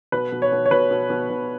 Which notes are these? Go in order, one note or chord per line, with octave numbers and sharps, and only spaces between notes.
B2 B4
B2
C#5
B2
C#5
B2 B4
B2
B2
B2